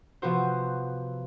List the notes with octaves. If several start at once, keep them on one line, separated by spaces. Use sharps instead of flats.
C3 F3 B3 F#4 C5